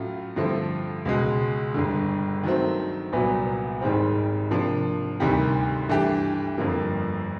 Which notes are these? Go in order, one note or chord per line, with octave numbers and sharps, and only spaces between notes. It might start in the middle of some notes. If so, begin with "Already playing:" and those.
Already playing: A2 F#3 A3 C#4 F4
G2 D3 F3 A3 C4
C#2 B2 G#3
G1 G2 D3
D#3 F#3 A3 C4
C2 A#2 F#3 B3
G#1 G#2 D#3 G3 C4
C3 F3 A#3 D4
D2 C3 D#3 G3
G2 E3 A3 D4 G4
G1 F2 D3 F3 A#3